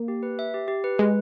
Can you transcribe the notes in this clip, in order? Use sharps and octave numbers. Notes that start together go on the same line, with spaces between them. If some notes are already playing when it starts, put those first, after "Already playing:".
Already playing: A#3
G4
B4
E5
G4
G4
B4
G#3 B4